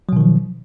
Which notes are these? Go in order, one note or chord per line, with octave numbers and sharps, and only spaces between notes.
B2 D#3 F3 F#3